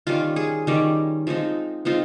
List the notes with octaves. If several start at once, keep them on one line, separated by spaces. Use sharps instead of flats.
D#3 G3 C#4 F4
G#4
D#3 G3 C#4
F3 G#3 C4 D#4
F3 G#3 C4 D#4 F4